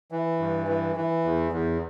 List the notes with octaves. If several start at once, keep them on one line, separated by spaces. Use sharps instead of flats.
E3
G2
E3
E3
E2
E2